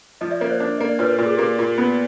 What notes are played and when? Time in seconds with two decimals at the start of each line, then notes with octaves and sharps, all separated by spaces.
0.21 F3 D#5 F5
0.31 D5 E5
0.40 A#3 C#5 D#5
0.50 C5 D5
0.60 D4
0.78 A#3 D#5
0.89 D5
0.99 A#2 B4 C#5
1.13 A#4
1.18 A#2
1.25 G#4
1.34 G4
1.39 A#3 G#4
1.59 A#2
1.78 B3